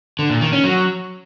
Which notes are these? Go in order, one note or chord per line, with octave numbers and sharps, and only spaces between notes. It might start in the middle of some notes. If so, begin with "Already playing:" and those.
D3
A#2
D#3
C#4
F#3